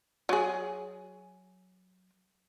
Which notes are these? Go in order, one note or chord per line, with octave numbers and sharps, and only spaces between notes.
F#3 G#4